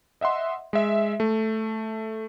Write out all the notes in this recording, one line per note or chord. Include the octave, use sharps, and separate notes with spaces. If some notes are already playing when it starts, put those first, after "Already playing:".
D#5 E5 F#5 C6
G#3 E5
A3